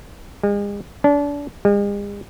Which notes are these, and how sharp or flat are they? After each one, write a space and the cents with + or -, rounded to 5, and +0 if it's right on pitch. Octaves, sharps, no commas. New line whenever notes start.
G#3 -40
D4 -30
G#3 -45